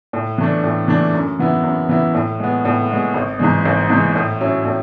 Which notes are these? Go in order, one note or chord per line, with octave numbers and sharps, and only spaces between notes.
A2
E3 A3 D4
A2
E3 A3 D4
F#2
E3 B3 E4
F#2
E3 B3 E4
A2
G#3 B3
A2
G#3 B3
G#1
G#2 E3 G#3
G#1
G#2 E3 G#3
A2
F#3 C#4 E4
A2